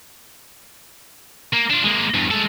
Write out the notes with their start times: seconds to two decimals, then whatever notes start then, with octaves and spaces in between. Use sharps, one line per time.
1.54 A#3
1.71 D4 F4
1.84 G#3 A#3
2.15 E2 G2
2.31 G#3 A4